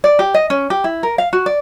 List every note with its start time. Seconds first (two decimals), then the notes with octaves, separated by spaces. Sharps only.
0.04 D5
0.19 G4
0.34 D#5
0.50 C#4
0.70 G4
0.84 E4
1.03 A#4
1.18 F5
1.33 F#4
1.46 D5